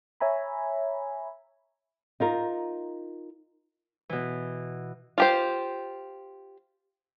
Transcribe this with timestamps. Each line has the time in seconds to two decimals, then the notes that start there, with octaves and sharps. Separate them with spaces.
0.20 C#5 E5 G#5 A#5 B5
2.20 D#4 F4 A#4
4.09 B2 E3
5.18 F4 G4 C5